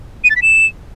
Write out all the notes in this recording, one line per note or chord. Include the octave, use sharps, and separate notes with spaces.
D#7
A6
B6
E7